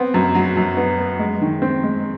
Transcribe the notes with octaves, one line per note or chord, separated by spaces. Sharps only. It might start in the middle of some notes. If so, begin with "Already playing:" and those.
Already playing: B3 C4
F#2
F#3
F#2
B3
B3
G#3
D#3
C4
G#3